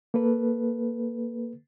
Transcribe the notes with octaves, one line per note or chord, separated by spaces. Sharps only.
A#3 A4 B4